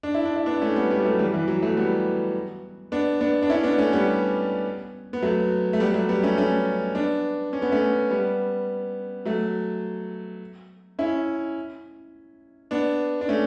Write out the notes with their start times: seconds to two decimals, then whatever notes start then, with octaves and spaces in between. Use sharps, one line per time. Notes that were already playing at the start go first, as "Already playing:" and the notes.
0.03 D4
0.14 E4
0.25 D4
0.36 E4
0.46 B3 D4
0.61 A3 C#4
0.76 G3 B3
0.90 G3 B3
1.04 F#3 A3
1.19 E3 G3
1.34 E3
1.48 F#3
1.62 F#3 A3
1.77 G3 B3
2.92 B3 D4
3.21 B3 D4
3.43 D4
3.50 C#4 E4
3.63 B3 D4
3.78 A3 C#4
3.93 G3 B3
5.13 B3
5.23 F#3 A3
5.73 A3
5.80 G3 B3
5.94 F#3 A3
6.09 G3 B3
6.23 A3 C#4
6.37 A3 C#4
6.95 B3 D4
7.53 C#4
7.62 B3
7.72 A3 C#4
8.10 G3 B3
9.25 F#3 A3
10.99 C#4 E4
12.71 B3 D4
13.21 D4
13.29 A3 C#4